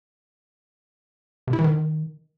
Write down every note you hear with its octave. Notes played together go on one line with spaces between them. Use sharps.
C3
E4
E3
D#3